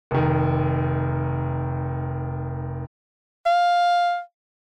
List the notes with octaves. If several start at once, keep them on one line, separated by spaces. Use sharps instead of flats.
F1 D#3
F5